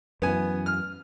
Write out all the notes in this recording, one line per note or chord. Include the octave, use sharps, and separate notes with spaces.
F#2 E3 B3 G#5
F6